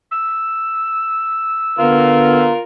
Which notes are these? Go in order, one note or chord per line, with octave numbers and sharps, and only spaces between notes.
E6
D3 B3 F4 A#4